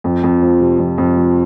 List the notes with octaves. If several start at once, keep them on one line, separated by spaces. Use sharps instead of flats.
F2
F2
F3
C3
F2
F2
F3